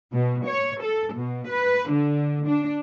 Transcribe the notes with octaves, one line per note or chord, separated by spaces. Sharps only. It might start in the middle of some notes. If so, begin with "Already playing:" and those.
B2
C#5
A4
B2
B4
D3
D4